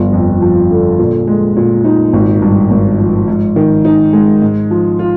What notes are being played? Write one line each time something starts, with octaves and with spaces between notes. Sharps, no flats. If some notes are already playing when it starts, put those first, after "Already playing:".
Already playing: G1 F3
F2
F3
D3
A#2
G#3
A#2
D#4
G#1
G2
G#1
F3
G#2
D#3
D#4
G#3
G#2
F3
F4